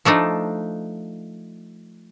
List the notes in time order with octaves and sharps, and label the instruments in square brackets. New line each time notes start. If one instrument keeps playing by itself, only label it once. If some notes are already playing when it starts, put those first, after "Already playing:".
[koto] F3 A3 D4 D#4